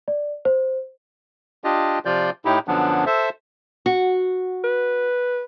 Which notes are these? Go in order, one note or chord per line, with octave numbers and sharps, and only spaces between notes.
D5
C5
D4 F4 G4 D#5
C3 F3 F4 D5 G6
A2 D#4 E4 G4
F#2 D3 F3 F#3 B3 D4
A4 C5 E5
F#4
B4